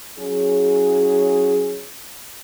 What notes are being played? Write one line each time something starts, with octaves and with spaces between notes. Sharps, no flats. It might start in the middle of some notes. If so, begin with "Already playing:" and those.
F#3 C#4 E4 G#4